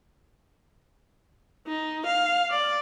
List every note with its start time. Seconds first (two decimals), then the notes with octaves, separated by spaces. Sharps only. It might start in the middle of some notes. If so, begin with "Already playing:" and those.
1.67 D#4
2.07 F5
2.50 D5